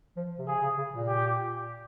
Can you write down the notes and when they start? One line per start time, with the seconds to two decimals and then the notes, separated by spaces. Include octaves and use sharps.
0.17 F3
0.39 C3
0.47 C#3 G#4
0.62 C#3
0.77 C#3
0.93 A#2
1.08 G4